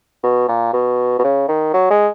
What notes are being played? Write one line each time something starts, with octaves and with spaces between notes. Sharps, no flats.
B2
A#2
B2
B2
C#3
D#3
F#3
G#3